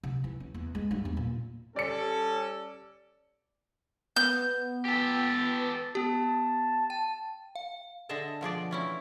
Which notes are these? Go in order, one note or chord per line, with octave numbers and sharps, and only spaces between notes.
C3
E3
C#4
E2
G#3
G2
E2
A#2
G3 C#4 A4 D5 C#7
B3 G6
G4 A4
B3 G4 A5
G5
F5
D3 G#4 D#5 E5 A5
B2 F3 G#4 D5
E3 C#4 E4